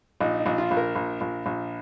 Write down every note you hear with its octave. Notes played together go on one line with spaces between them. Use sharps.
A#1 D#4
D#4
A#1
F4
A#1
A#4
A#1
A#1
A#1